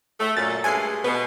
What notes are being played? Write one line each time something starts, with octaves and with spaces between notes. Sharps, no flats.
A3
F#2 A#2 A6
G2 G#3 A3 G#5 C7
B2 B4